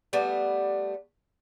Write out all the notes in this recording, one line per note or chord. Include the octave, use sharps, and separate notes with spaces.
G3 A3 B3